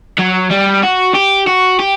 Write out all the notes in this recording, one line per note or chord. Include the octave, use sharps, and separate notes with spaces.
F#3
G3
F#4
G4
F#4
G4